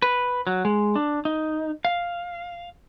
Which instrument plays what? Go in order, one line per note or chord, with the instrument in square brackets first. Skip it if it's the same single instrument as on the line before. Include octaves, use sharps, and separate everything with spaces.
[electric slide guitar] B4
F#3
G#3
D4
D#4
F5